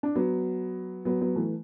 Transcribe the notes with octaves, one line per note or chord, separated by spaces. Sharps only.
D4
F#3 B3
F#3 B3
F#3 B3
E3 A3